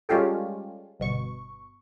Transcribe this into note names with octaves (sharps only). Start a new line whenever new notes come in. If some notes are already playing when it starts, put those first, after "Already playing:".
G3 G#3 C#4 F4 G4 A4
G1 B2 C#6